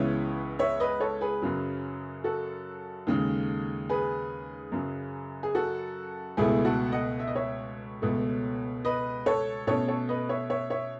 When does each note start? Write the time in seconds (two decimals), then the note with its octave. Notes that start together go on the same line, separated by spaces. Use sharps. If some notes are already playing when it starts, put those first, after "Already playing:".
Already playing: C#2 C#3 E3 B3 C#5 E5
0.59 C#5 E5
0.80 B4 D#5
1.00 A4 C#5
1.21 G#4 B4
1.42 F#2 C#3 F#3
2.24 F#4 A4
3.07 D#2 C#3 G#3
3.89 G#4 B4
4.72 F#2 C#3 F#3
5.43 G#4
5.55 F#4 A4
6.37 C#2 B2 A3 E4 G#4
6.65 F#4 A4
6.92 D#5 F#5
7.20 E5
7.28 D#5
7.35 C#5 E5
8.02 C#2 B2 A3
8.85 B4 D#5
9.26 A4 C#5
9.67 B2 A3 C#4 A4 C#5
9.88 A4 C#5
10.09 B4 D#5
10.29 C#5 E5
10.50 C#5 E5
10.70 C#5 E5